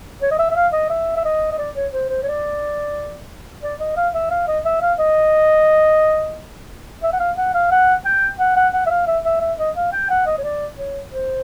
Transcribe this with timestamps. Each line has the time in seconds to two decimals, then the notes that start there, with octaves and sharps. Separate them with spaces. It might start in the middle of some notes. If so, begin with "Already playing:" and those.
0.22 C#5
0.31 D#5
0.39 E5
0.50 E5
0.56 F5
0.73 D#5
0.90 E5
1.17 E5
1.25 D#5
1.52 D#5
1.58 D5
1.75 C#5
1.92 C5
2.09 C5
2.23 C#5
2.26 D5
3.63 D5
3.80 D#5
3.97 F5
4.14 E5
4.31 F5
4.47 D#5
4.65 E5
4.82 F5
4.99 D#5
7.03 E5
7.13 F#5
7.20 F5
7.37 F#5
7.54 F5
7.71 F#5
8.05 G5
8.39 F#5
8.56 F#5
8.73 F#5
8.86 E5
8.90 F5
9.07 E5
9.24 E5
9.41 E5
9.58 D#5
9.76 F5
9.92 G5
10.10 F#5
10.27 D#5
10.38 C#5
10.43 D5
10.77 C#5
11.11 C5